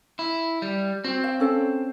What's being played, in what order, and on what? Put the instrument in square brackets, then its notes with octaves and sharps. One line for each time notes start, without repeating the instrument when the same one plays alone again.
[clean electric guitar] E4
G3
[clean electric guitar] C4 [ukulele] F#4
[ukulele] F5
C#4 A4 F5